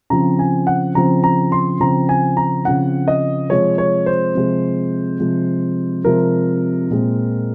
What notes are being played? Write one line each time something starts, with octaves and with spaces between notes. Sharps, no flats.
C#3 F3 C4 A#5
G#5
F#5
C#3 F3 C4 A#5
A#5
C6
C#3 F3 C4 A#5
G#5
A#5
C#3 F3 C4 F#5
D#5
C3 F3 G#3 C#5
C#5
C5
C3 F3 G#3
C3 F3 G#3
C3 F3 G#3 A#4
A#2 G#3 C4